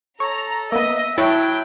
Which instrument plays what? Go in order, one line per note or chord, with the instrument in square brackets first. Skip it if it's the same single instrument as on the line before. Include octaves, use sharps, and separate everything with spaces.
[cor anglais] A4 [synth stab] C#5 [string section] A#5
[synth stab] A#3 B3 [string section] D#5 [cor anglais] E5
[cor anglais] F#3 [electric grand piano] E4 [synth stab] C#5 E5 A5 [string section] G5